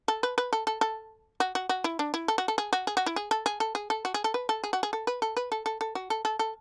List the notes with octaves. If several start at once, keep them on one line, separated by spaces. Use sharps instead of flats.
A4
B4
B4
A4
A4
A4
F#4
F#4
F#4
E4
D4
E4
A4
F#4
A4
G#4
F#4
G#4
F#4
E4
G#4
A4
G#4
A4
G#4
A4
F#4
G#4
A4
B4
A4
G#4
F#4
G#4
A4
B4
A4
B4
A4
A4
A4
F#4
A4
A4
A4